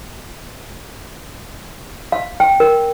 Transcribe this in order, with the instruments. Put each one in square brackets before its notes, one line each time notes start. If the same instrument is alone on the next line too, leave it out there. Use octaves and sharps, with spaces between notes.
[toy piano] F5
G5
A#4